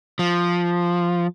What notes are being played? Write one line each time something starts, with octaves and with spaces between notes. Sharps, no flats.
F3